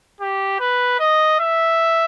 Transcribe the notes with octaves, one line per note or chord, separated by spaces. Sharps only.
G4
B4
D#5
E5